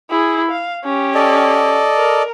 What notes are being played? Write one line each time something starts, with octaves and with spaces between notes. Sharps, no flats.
E4 G#4
F5
C#4 G4
A4 D5 D#5
A#4